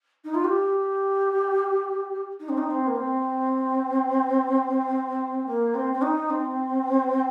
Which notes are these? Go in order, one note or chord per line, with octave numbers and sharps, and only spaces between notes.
D#4
F4
G4
D#4
C4
D#4
C4
A#3
C4
A#3
C4
C4
D#4
C4